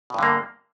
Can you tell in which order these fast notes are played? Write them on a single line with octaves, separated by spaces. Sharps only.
B2 G2 D3 A#3